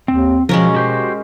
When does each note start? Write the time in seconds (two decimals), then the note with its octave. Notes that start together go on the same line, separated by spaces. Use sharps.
0.08 D#2 C4
0.49 B2 F3 G#3 C#4 A#4
0.74 F#4 G4 C5